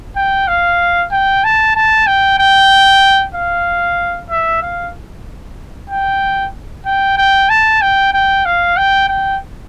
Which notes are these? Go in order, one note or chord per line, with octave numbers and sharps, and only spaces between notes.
G5
F5
G5
A5
A5
G5
G5
F5
E5
F5
G5
G5
G5
A5
G5
G5
F5
G5
G5